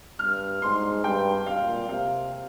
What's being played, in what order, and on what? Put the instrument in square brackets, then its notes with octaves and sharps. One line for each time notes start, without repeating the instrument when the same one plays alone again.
[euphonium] G2 [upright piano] F6
[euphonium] G#2 [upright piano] C6
[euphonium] G2 [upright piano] G5
[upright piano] F5
[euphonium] A#2
[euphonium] C3 [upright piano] F5